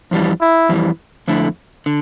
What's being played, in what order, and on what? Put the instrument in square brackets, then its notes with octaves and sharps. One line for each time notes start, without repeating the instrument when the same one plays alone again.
[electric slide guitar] F2 E3 G3
[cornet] E4
[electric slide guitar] F2 E3 G3
F2 D3 A3 E4
D3